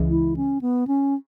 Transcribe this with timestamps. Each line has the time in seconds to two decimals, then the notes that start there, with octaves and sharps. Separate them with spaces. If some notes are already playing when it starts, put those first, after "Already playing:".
Already playing: C#2 C#3 E3 G#3
0.10 E4
0.36 C#4
0.61 B3
0.87 C#4